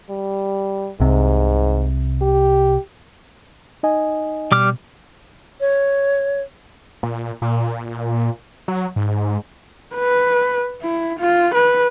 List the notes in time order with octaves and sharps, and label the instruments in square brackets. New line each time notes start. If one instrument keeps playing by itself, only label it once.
[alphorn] G3
[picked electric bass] C2 C3 [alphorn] G#2
[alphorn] G4
[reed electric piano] D#4 D#5 G#5
[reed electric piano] B2 [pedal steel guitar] G3 D6 F6
[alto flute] C#5
[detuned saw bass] A#2
A#2
F#3
G#2
[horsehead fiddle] B4
E4
F4
B4